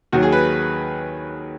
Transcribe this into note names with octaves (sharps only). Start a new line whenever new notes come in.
D#2 D#3 F#3 F#4
G#4
B4